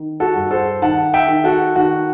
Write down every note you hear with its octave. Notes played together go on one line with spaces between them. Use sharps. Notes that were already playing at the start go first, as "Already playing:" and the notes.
Already playing: D#3
F#4 A4
G2
A4 C5
D#3 F#5 A5
E5 G5
D#3
F#4 A4
D#3 F#4